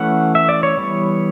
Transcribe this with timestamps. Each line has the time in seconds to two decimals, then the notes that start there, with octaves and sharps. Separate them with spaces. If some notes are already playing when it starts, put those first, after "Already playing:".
Already playing: E3 A3 C#4 F#5
0.35 E5
0.49 D5
0.63 C#5
0.77 E3 G3 B3